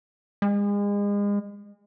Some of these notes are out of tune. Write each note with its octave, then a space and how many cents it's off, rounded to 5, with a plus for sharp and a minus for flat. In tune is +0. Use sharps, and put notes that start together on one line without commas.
G#3 -35